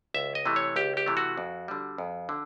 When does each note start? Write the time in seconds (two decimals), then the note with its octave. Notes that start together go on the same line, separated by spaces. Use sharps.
0.14 C#2 E5
0.35 D#5
0.46 C3 E3 A3
0.56 C#5
0.76 C#2 G4
0.97 G4
1.06 C3 E3 A3
1.17 F#4
1.37 F2
1.68 D3 G3
1.98 F2
2.29 D3